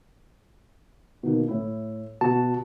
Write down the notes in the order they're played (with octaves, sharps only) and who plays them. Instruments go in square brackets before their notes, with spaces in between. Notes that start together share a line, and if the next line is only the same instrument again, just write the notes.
[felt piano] B2 D#3 A#3
A2 E4
[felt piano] B2 [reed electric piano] F#4 A5